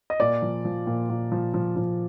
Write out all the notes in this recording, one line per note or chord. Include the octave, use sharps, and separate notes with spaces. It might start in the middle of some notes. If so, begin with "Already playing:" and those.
D#5
A#2 D5
F3
F3
A#2
A#2
F3
F3
F3